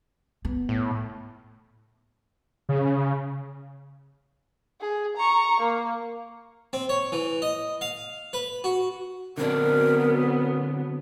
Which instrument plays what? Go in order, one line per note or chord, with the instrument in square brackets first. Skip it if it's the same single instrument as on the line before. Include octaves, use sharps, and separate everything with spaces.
[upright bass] B3
[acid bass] A2
[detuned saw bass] C#3
[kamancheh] G#4
A#5 C#6
A#3
[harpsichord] C4
C#5
E3
D#5
F5
B4
F#4
[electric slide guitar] D3 C4 D4 [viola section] F#3 B3 [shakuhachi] A#4